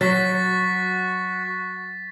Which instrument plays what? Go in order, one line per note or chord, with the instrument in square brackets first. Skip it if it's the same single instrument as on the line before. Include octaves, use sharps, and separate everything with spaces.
[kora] F#3 [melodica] F#4 [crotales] A6 B6